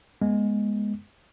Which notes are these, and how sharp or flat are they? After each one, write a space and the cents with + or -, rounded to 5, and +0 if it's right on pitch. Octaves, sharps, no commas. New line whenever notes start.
G#3 +0 B3 -25